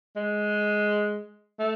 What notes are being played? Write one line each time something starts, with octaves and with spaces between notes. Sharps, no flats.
G#3
A3